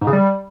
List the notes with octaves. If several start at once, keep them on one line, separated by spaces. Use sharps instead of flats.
G#2
C#3
G3